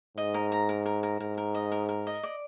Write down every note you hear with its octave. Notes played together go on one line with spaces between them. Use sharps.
G#2 D#5
A#4
A#5
A#4
A#4
A#4
G#2 A#4
A#4
D#5
A#4
A#4
D#5
D5